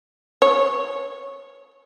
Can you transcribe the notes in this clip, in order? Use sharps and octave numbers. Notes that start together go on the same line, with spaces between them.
C#5